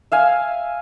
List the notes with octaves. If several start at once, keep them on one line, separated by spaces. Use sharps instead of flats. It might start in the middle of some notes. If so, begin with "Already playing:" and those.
E5 F5 G#5